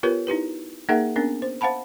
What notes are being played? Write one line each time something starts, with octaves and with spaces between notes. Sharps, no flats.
B3 F4 G4 A#4 B4 C#5
D#4 E4 G4 B4
A#3 D#4 G#4 A#4 E5 F#5
B3 C#4 D4 A#4
C5
C5 F5 F#5 A5 B5